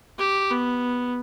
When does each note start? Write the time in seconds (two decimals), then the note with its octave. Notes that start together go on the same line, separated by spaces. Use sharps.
0.19 G4
0.51 B3